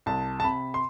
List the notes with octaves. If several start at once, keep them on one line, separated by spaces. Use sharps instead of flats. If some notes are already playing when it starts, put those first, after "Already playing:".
C2 A5
A5
C3 B5
C6